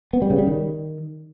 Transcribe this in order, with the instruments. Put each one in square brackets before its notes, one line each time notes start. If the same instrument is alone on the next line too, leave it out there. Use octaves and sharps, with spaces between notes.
[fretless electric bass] B3
G3
C#3
G3
D#3